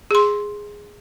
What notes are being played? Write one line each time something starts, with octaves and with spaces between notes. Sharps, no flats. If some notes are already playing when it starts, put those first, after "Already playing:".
G#4 C6